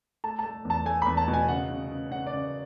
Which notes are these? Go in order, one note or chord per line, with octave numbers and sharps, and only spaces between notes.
A3 A5
A5
A3
E2
A5
A3 G#5
E2 B5
A5
B2
G#5
C#3 F#5
C#3
C#3
C#3 F#5
D5
C#3